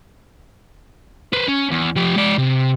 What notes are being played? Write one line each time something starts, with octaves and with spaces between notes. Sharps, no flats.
B4 C5
C#4
E2
F3 G4
G#3 D5
C3